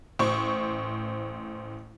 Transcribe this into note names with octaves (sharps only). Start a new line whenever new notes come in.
A1 C5 C#6